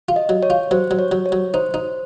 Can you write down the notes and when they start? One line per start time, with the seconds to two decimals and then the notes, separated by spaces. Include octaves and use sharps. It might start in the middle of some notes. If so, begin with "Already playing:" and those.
0.09 F4
0.16 D#5
0.29 F#3
0.43 C#5
0.50 F4
0.71 F#3 C5
0.91 F#3
0.99 C#5
1.11 F#3
1.26 C#5
1.32 F#3
1.54 D#4 C5
1.74 D#4